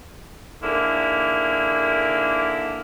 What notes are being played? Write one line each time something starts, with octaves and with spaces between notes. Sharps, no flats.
G#2 D3 A#3 E4